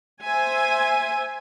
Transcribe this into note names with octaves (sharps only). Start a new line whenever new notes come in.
C5 E5 G#5